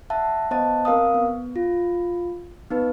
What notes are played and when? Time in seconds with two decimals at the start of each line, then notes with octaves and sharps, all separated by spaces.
0.10 E5 F#5 A5
0.51 B3 C5 D#5 A5
0.85 C4 A#4 F5 D#6
1.14 B3
1.56 F4
2.71 B3 D#4 B4